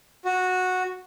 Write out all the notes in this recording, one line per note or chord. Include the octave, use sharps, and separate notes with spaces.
F#4